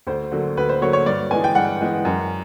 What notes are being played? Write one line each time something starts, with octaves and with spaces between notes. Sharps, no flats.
D2 C5
D3 F#3 A#3
D2 B4
C5
D3 F#3 A#3 C#5
C#5
G2 D5
E3 G#3 B3 G#5
G5
G2 F#5
E3 G#3 B3
F#2